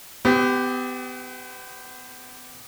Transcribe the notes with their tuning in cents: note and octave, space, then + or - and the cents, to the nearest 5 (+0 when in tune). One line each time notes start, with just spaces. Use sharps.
B3 +35 G4 +0